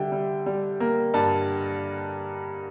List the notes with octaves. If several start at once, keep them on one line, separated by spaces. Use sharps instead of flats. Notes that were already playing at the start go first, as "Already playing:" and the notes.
Already playing: D3 G3 E5 G5
G3
G3
A#3
G2 A5